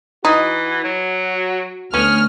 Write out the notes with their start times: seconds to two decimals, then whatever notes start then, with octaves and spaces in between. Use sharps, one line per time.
0.25 E3 D#4 F#4
0.84 F#3
1.94 D2 B3 C#4 F6